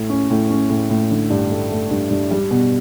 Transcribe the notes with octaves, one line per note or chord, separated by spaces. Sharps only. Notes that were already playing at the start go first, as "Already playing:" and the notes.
Already playing: A2
C#4
A2
C#4
A2
A2
D3
G2
A3
A3
G2
G2
G3
B2